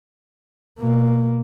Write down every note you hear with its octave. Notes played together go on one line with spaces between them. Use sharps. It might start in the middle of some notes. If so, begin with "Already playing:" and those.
B2 A#3